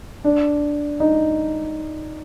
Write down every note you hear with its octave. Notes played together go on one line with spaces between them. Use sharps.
D4
D#4